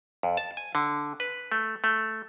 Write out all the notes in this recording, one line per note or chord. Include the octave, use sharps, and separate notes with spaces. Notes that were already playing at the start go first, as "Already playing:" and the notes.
F2
A5
G#5
D3
B4
A3
A3